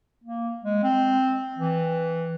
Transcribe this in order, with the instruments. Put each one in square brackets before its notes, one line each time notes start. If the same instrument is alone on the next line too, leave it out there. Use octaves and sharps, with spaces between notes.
[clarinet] A#3
G#3
C4
E3